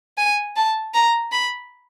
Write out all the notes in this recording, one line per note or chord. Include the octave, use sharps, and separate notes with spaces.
G#5
A5
A#5
B5